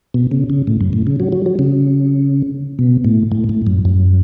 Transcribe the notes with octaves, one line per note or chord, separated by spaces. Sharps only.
B2
C#3
C#3
A2
F#2
A2
C#3
F#3
F#3
F#3
C#3
B2
A2
A2
A2
F#2
F#2